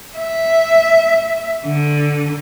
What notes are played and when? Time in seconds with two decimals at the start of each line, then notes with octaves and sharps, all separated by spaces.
0.17 E5
1.66 D3